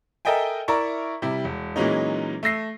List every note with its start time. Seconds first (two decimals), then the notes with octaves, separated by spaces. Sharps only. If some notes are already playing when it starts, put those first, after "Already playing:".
0.25 A4 A#4 D#5 E5 G5 G#5
0.68 E4 A#4 D5 E5 A#5 C#6
1.22 C3 G3 E4
1.44 E1
1.76 A#2 E3 F#3 G#3 C#4 D#4
2.43 A3 E6 A#6 C7